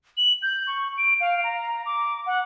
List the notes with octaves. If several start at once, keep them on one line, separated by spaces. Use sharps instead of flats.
F#7
G6
C#6
D7
F5
A#5
D6
F#5